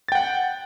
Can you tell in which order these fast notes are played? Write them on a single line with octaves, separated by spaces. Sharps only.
A6 G5 F#5